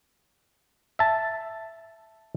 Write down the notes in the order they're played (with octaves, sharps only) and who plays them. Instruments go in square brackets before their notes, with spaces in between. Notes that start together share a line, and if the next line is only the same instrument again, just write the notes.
[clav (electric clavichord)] E5 A5